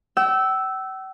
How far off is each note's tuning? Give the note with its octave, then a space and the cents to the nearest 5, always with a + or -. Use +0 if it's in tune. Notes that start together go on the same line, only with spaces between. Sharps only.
G5 -45 E6 +0